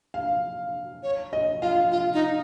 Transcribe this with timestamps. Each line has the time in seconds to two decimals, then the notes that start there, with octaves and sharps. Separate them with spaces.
0.14 F5
1.03 C#5
1.33 D#5
1.62 F4 F5
1.92 F4 F5
2.14 D#4